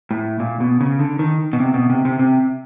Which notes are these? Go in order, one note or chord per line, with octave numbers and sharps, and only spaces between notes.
A2
A#2
B2
C#3
D3
D#3
B2
C3
B2
C3
C3
C3